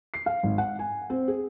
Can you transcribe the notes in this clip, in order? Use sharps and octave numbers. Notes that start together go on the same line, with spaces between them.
C7
F5
G#1
F#5
G#5
C4
G#4